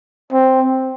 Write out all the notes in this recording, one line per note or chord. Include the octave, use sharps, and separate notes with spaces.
C4